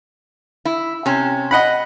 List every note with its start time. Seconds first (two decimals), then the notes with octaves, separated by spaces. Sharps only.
0.65 E4
1.06 C3 C#4
1.51 D#5 F#5 B5